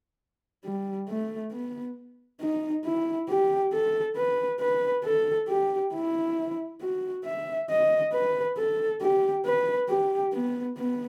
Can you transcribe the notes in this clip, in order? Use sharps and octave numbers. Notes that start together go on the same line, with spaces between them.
G3
A3
B3
D#4
E4
G4
A4
B4
B4
A4
G4
E4
F#4
E5
D#5
B4
A4
G4
B4
G4
B3
B3